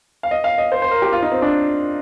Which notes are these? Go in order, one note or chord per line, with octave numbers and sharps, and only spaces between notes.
F5
D#5
F5
D#5
C5
C5
A#4
G4
F4
D#4
C4
D4